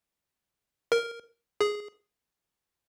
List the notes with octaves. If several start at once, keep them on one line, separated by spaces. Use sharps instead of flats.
A#4
G#4